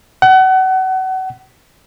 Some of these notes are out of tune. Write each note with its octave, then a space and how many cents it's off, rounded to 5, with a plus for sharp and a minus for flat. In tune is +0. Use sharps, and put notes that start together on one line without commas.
F#5 +30